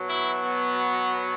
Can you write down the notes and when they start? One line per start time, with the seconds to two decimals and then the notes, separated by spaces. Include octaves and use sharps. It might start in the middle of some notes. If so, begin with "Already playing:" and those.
Already playing: B2 F#3
0.08 E4
0.42 B3